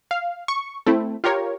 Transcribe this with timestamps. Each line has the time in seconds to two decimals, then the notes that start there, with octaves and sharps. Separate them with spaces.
0.11 F5
0.48 C#6
0.86 A3 C4 E4
1.24 F4 G4 A#4 C#5